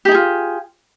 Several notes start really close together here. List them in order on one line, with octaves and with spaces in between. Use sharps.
G4 D#4 G#4 F4